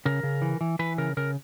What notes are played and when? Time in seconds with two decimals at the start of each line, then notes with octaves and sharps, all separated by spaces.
0.05 C#3 A#4
0.23 C#3
0.42 E3
0.61 E3
0.79 E3 B4
0.98 C#3 A#4
1.17 C#3 A#4